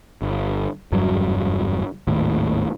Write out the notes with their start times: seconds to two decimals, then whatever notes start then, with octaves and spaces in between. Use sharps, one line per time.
0.22 G1
0.92 F#1 E2 G2 F#3
2.07 G#1 D#2 A2